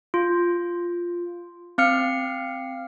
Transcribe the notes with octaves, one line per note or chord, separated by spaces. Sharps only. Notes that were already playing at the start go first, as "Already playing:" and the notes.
F4
C4 F5 F6 C#7